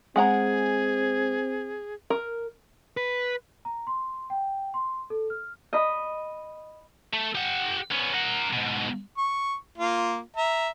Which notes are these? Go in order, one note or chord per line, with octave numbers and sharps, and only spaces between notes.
G#3 C4 G#4 F#5 A#5
A#4
B4
A#5
C6
G5
C6
A4
F6
D#5 B5
A3
G4 F#5
B3 C#4
A#4 F#5
G#2 B2
C#6
A#3 F4
E5 A#5